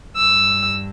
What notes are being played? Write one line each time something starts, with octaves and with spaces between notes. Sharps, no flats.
G2 E6